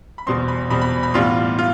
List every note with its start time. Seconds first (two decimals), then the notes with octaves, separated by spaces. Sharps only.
0.18 B5
0.26 E2 B2 G3 C4 C6
0.48 B5
0.70 E2 B2 G3 C4 B5
0.81 B5
1.03 B5
1.14 A2 E3 G3 B3 F4 C6
1.59 F4